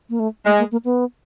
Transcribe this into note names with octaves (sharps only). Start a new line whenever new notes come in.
A#3
A3
G#3 A3
A#3
A#3
B3